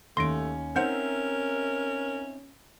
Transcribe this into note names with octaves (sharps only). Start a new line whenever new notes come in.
D#2 A3 C#4 C6 A#6 D7
C4 C#4 D#4 A#4 C5 E5 F#5 G6